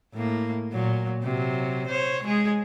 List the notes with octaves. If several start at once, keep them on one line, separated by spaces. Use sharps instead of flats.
A2 A#3
A#2 F#3
C3 F#3
C5 C#5
G#3 G#4